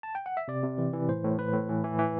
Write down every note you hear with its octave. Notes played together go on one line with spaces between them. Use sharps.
A5
G5
F#5
E5
C3 D5
C3
E3
E3
A2 C5
A2
A2 B4
A2
E3
E3
E3